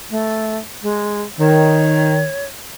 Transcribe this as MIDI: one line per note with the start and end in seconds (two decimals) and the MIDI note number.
0.10 0.57 57
0.82 1.21 56
1.40 2.25 51
1.40 2.45 73